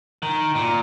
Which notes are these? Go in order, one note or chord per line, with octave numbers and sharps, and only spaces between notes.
D#3
A#2